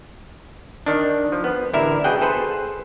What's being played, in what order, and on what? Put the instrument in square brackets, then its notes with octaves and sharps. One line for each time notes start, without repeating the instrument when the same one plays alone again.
[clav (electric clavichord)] D#3 D4
F3
B3
A1 D3 E4 A#4 E5
B2 G#4 F#5 G5
G#4 A4 B4 C5